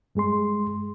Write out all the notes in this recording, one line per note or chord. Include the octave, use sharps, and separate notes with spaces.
G2 G#3 G#4 C6